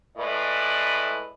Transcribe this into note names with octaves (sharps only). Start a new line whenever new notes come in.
A2 G#3 B4 D5